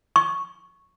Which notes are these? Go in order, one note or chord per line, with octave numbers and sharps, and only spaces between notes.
C#6